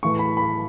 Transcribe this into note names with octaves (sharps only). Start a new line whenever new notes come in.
A2 E3 A3 C#6
B5
B5